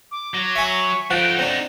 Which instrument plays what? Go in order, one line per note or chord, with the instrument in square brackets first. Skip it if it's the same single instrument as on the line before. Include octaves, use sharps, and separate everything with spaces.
[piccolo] D6
[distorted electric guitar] F#3
[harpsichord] E5 G#5 [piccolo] C#6
[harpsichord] F3 [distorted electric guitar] A3 D#4 [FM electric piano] F#5 [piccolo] D7
[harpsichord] C4 D4 [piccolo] A#6